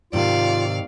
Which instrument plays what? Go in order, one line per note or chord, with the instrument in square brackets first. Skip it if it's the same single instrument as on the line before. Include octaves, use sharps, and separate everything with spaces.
[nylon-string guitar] G#2 C3 D#3 [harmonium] F4 [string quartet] D5 F5